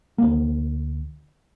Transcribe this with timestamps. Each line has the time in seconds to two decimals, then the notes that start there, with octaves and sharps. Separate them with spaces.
0.18 D2 A#3